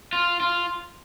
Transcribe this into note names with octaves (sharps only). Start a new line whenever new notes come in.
F4
F4